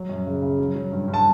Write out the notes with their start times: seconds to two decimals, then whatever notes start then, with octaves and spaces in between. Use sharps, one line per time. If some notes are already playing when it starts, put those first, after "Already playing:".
Already playing: F#3
0.09 F#2
0.26 C#3
0.42 C#3
0.59 F#3
0.75 F#3
0.92 G2
1.08 G2
1.14 A5